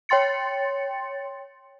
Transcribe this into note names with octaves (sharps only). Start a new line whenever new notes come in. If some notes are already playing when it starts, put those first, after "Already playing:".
C#5 G5 C6 A6 C#7